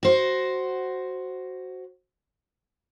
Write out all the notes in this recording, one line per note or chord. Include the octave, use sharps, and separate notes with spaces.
F#4 C5